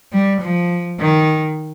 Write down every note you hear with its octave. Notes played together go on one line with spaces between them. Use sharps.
G3
F3
D#3